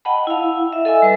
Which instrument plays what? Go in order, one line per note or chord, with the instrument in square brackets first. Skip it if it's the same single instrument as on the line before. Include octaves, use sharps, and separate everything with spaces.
[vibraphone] D#5 F#5 G5 A5 B5
E4 F5
E5
A4 D#5 E5 G#5 E6
G3 B4